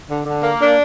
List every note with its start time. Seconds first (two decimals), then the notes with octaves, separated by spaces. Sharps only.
0.09 D3
0.26 D3
0.43 A#3
0.59 D4